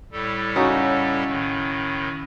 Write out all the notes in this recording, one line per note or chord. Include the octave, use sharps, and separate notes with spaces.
A2 G3 A4
C#3 D#4 F#4
A2 D#3